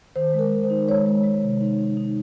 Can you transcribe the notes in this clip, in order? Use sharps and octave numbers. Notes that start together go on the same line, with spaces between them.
D#3 C5
G#3
A#4
D#3
C5
D#4
G#3 C#5
G#3
G#3
C3
D#4
D#4
D#4